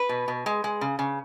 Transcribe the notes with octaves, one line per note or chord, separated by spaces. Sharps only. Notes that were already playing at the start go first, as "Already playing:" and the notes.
Already playing: B4
B2
B2
G#3
G#3
C#3
C#3